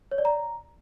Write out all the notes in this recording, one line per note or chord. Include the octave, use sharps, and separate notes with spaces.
C#5
D5
A#5